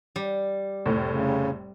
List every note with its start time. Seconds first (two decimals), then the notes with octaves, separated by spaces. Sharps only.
0.16 G3
0.86 F1 A2
1.10 C#3